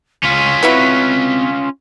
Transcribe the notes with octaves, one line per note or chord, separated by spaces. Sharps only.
C#2 C#4 F4 B6
C4 E4 F#4 B4 C6